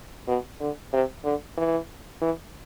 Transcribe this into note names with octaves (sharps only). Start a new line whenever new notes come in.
B2
D3
C3
D3
E3
E3